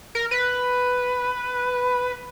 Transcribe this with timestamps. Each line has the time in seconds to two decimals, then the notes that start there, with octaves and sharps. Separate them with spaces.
0.15 A#4
0.31 B4